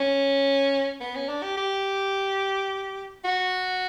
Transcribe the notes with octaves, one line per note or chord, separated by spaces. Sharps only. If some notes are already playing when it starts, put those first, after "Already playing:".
Already playing: C#4
B3
C#4
D4
G4
G4
F#4